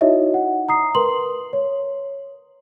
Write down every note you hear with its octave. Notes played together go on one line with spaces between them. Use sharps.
D#4 E4 F#4 C#5 D#5 E5
F#5
A#5 D#6 C7
A#4 B4 C6 F#7
C#5